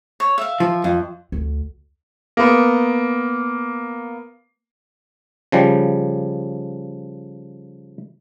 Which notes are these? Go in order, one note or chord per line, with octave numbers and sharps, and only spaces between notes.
C#5
E5 F5
F3
F2
D2
A#3 B3
C#3 F3 G3